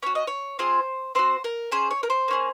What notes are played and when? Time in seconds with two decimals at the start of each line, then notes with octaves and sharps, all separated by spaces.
0.03 C#4 F#4 C#5
0.15 D#5
0.27 C#5
0.59 C4 F4 G#4 C5
1.15 C4 F#4 C5
1.44 A#4
1.72 C#4 G#4 C5
1.91 C#5
2.03 A#4
2.10 C5
2.28 A#3 C#4 G#4